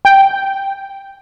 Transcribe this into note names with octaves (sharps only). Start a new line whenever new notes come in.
G5